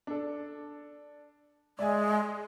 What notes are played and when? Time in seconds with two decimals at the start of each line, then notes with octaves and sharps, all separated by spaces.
0.07 D4 A4
1.79 G#3 D5 E5 G#5